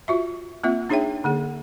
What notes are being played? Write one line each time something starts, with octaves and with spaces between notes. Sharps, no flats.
F4 F#4 E5
A#3 C4 F4 E5
D4 D#4 G#4 C#5 E5 G5
D3 A#3 G#4